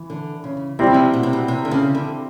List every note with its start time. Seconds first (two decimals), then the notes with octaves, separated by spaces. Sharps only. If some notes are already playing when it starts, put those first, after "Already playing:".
Already playing: E3
0.10 D3
0.44 C#3
0.79 C3 G3 C4 E4
0.87 C#3
0.94 C3
1.14 B2
1.23 C3
1.33 B2
1.48 C3
1.65 D3
1.71 C#3
1.95 D3